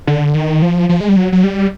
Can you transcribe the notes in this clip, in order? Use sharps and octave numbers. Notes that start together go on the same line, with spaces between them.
D3
D#3
F3
F3
G#3
G3
F#3
F#3
G3